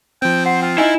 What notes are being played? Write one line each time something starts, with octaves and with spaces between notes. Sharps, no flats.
F3 C4 G5
C5 F#5
F4 G5
D#4 E4 D#5 G#5